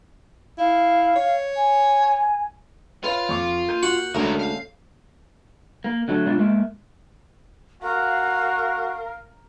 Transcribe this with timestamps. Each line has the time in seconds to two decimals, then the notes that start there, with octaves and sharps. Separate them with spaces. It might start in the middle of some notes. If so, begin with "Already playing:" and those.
0.58 E4 F5
1.16 C#5
1.56 G#5
3.04 F4 B4 C#5 F5
3.29 F2 C#6 D6
3.68 A#3 G6 D#7
3.83 F#4 F#5
4.15 D2 E3 G#3 C#4 A4 A#4
4.39 F5
5.84 A#3
6.08 D3 F#3 A3
6.26 G#2 B2 D4 F4
6.39 G#3 A#3 E5
7.83 F#4 A#4 F5